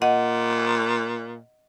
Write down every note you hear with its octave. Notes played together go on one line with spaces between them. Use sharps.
A#2 D#5 F#5